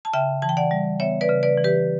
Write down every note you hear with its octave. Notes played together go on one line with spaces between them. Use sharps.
A5
C#3 E5 G5
E3 A5
G5
D5 F#5
G3
B3 C#5 E5
B4 D5
C#3
B4 D5
E3
G4 B4